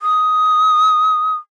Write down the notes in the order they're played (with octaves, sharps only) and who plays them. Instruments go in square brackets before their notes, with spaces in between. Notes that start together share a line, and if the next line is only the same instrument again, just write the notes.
[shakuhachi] D#6